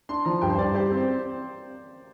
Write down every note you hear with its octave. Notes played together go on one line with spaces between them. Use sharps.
D4 C6
F3 A#5
G2 G5
C5
G2 D5
G4 C5
C4
C5